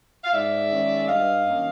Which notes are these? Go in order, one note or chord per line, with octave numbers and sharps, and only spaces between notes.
F5
G#2 D5 E5
D#3 G#3 C#4
G2 D#5 F5
D#3 F#3 A#3 C#4